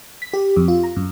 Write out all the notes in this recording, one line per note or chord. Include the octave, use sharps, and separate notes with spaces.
B6
G4
F2
F4
A#5
F#2